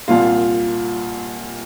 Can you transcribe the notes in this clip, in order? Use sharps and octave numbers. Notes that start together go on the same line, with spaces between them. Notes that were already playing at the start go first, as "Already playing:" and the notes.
C2 A#2 F4